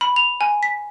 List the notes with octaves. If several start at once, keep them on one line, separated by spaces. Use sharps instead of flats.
B5
F7
G#5
B6